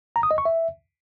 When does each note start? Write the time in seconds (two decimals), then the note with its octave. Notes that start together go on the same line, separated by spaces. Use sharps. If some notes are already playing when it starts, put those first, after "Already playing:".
0.16 A#5
0.23 D#6
0.31 D#5
0.38 C#6
0.45 E5